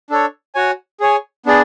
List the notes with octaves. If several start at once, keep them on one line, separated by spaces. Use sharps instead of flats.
D4 A4 C#5
F#4 C#5 G#5
G#4 C#5 G#5
B3 D4 G#4 D5